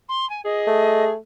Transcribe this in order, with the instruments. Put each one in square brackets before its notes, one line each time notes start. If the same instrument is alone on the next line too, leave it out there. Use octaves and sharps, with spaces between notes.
[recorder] C6
G#5
[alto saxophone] G#4 [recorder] D#5
[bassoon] A3